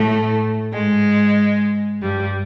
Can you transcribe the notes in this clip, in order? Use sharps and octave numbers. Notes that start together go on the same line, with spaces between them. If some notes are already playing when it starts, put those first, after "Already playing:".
Already playing: A2 A3
G#2 G#3
G2 G3